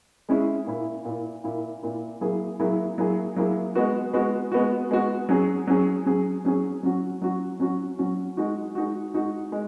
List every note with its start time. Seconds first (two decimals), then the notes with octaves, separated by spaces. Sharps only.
0.29 G#3 C#4 E4 G#4
0.67 A#2 A#3 E4
1.05 A#2 A#3 E4
1.44 A#2 A#3 E4
1.83 A#2 A#3 E4
2.21 F#3 A#3 E4 G#4
2.60 F#3 A#3 E4 G#4
2.98 F#3 A#3 E4 G#4
3.36 F#3 A#3 E4 G#4
3.75 G#3 B3 F#4
4.14 G#3 B3 F#4
4.52 G#3 B3 F#4
4.91 G#3 B3 F#4
5.29 F#3 C#4 G#4
5.67 F#3 C#4 G#4
6.06 F#3 C#4 G#4
6.45 F#3 C#4 G#4
6.83 F#3 C#4 F#4
7.21 F#3 C#4 F#4
7.60 F#3 C#4 F#4
7.99 F#3 C#4 F#4
8.37 G#3 D#4 F#4
8.75 G#3 D#4 F#4
9.14 G#3 D#4 F#4
9.52 G#3